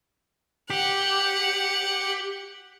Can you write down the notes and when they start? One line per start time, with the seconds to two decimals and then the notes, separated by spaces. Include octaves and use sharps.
0.70 G4 F#5